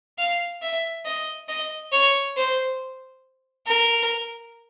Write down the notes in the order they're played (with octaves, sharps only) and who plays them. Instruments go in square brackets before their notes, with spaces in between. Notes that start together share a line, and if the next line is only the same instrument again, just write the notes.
[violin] F5
E5
D#5
D#5
C#5
C5
A#4